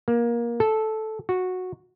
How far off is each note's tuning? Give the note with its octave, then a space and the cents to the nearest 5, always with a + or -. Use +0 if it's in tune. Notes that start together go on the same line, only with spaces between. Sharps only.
A#3 +20
A4 -10
F#4 -10